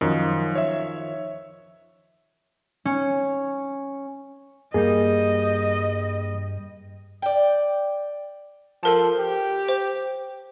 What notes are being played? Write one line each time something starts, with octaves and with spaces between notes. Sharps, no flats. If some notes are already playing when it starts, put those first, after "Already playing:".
F#2 D#3 F3
C#5 E5
C#4
G2 G3 A#3 G#4 D#5
D5 G5
F3 A4 A#4 A5
G4
C5